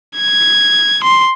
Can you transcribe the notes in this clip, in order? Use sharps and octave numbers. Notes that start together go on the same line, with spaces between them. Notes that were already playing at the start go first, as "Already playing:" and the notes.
G#6
C6